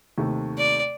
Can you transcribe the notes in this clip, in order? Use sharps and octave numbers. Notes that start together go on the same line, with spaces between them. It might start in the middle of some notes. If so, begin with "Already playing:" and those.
D#2 C3 A3
D5